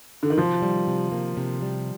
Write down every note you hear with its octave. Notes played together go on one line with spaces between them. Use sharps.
D3
D#3
C3 F3
G3
C3
A#3
C3
G3